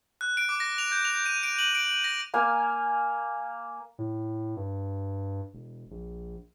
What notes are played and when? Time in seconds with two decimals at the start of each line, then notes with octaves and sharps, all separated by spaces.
0.21 F#6
0.37 D7
0.49 D6
0.60 A#6
0.78 F7
0.92 G6
1.05 F7
1.26 D#7
1.43 D7
1.59 F#7
1.75 D7
2.04 A#6
2.34 A#3 F5 G#5
3.99 A2
4.57 G2
5.53 E1
5.91 A#1